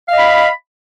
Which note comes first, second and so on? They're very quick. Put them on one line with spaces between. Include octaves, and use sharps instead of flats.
F5 D#5 B5